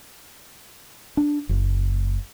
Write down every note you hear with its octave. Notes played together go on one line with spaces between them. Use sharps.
D4
F#1